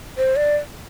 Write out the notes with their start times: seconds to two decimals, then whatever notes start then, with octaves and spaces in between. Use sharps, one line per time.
0.18 C5
0.36 D5